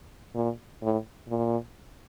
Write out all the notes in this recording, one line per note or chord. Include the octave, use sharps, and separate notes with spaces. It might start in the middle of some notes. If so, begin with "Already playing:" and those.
A#2
A2
A#2